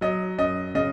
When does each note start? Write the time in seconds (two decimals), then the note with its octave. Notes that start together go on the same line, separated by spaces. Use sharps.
0.01 F#3 D#5
0.38 F#2 D#5
0.75 C#3 D#5